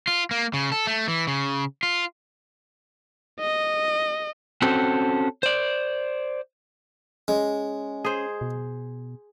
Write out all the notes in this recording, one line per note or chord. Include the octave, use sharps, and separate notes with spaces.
F4
A#3
C#3
A4
A3
E3
C#3
F4
D#5
C4 C#4 F#4 A4 C5
C5 D5
G#3 C#4
G#4 C5
B2